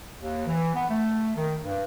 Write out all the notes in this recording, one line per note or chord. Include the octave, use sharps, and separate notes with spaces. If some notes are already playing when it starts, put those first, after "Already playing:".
D#2
E3
B3
A3
D#3
G2